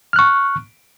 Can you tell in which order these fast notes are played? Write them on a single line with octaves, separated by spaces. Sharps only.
F6 F#6 C#6